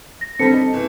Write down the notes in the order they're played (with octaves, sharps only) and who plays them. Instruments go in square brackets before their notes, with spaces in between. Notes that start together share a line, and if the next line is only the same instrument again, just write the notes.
[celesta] A#6
[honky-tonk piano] D3 G3 [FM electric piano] C4 A4 A5 [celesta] C#7
[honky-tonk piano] D#4
F#1 E3